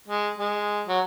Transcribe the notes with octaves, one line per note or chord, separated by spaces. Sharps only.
G#3
G#3
F#3